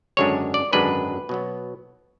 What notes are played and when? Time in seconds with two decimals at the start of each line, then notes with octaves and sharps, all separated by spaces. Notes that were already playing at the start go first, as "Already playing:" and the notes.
0.17 G#1 F#2 D3 G#3 D4 C#5
0.54 D5
0.73 G#1 F#2 D3 G#3 D4 B4
1.29 B2 F#3 B3